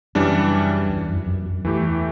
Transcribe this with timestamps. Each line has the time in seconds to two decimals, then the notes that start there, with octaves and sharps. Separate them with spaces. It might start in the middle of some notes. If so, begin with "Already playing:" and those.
0.15 F#2 C#3 E3 G3 D4
0.90 E2
1.09 F#2
1.27 F#2
1.46 F#2
1.64 E2 E3 A3 E4 G4